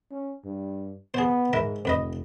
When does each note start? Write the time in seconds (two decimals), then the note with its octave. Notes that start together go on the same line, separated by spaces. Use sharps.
0.11 C#4
0.45 G2
1.14 B3 G#4 C5
1.53 G#2 A#4 B4 E5
1.85 F1 F2 B4 D#5